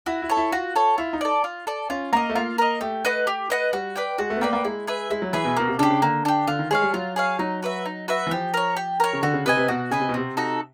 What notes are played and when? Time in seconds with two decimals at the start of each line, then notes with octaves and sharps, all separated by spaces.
0.06 E4 F#4
0.22 E4
0.29 A4 C#5
0.37 E4
0.52 F4 F#4
0.76 A4 C#5
0.98 E4 F4
1.13 D#4
1.21 A4 D5
1.44 F4
1.67 A4 D5
1.90 C#4 F4
2.13 A#3 A#4 D#5
2.30 A3
2.35 A#3 F4
2.58 A#4 D#5
2.81 A3 G4
3.05 B4 D#5 F#5
3.27 G4
3.50 B4 D#5 F#5
3.73 G3 F#4
3.96 B4 D5 G5
4.18 G#3 F#4
4.30 A3
4.36 B3
4.41 A#3 B4 D5 G5
4.53 A#3
4.64 G#3 E4
4.87 G#4 B4 E5
5.11 G#3 E4
5.22 F#3
5.33 E3 G#4 B4 E5
5.45 B2
5.57 B2 A#3
5.68 C3
5.79 C#3 D4 G4
5.90 C#3
6.02 D3 A#3
6.25 D4 G4
6.47 D3 F4
6.59 D#3
6.71 G#3 G#4 C#5 F5
6.82 G3
6.94 F#3 F4
7.16 G#4 C#5 F5
7.39 F#3 D#4
7.62 F#4 B4 E5
7.85 D#4
8.08 F#4 B4 E5
8.27 E3
8.31 F3 G4
8.54 A#4 C#5
8.76 G4
9.00 A#4 C#5
9.13 C#3
9.23 D3 F#4
9.34 C#3
9.46 C3 B4 D#5 G#5
9.57 C3
9.68 B2 F#4
9.91 C#3 B4 D#5 G#5
10.00 C3
10.09 B2
10.14 C3 C4
10.37 D#4 F#4 A4